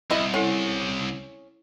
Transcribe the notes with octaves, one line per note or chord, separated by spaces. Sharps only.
C2 E4 D#5
C#4 E4 A4 F#5